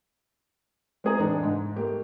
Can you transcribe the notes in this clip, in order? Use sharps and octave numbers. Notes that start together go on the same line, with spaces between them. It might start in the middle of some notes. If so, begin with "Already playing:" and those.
G#3 A3 C4 G#4 A#5
A2 E3 G#3 D4 D#4 A4
G#2
A3 A#3 G4